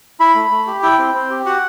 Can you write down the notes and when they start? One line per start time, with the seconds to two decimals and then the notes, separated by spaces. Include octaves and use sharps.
0.20 E4 B5
0.35 A3
0.51 A3
0.67 G4
0.83 E4 G5
0.98 C4
1.14 C4
1.30 G4
1.46 F#4 F#5